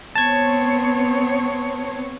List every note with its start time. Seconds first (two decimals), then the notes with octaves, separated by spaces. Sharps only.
0.15 B3 C4 C#5 A5 G#6